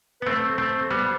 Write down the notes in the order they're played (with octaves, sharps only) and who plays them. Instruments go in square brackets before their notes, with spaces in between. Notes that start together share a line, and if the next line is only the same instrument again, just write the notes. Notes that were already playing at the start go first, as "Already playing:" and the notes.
[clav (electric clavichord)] B3 [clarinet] B4
[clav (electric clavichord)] A3 C4 [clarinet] C5
[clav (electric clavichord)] A3 C4
G3 B3